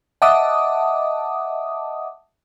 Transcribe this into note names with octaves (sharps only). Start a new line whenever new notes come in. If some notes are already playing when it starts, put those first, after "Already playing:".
D#5 E5 F#5 A5 D6 D#6